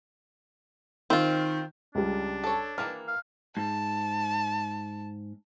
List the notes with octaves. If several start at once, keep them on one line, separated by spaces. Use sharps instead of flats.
D#3 C4 F4
C#2 G3 D4
A4 C#5
D#3 E3 A#3 F6
F5
G#2 A5